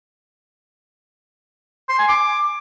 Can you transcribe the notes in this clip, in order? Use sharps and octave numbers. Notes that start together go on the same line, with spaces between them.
C6
G#5
D6